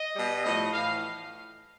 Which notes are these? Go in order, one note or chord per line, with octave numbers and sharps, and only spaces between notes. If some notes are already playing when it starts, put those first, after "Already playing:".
Already playing: D#5
B2 G3
A2 F3 A3 D#5
A2 E3 F5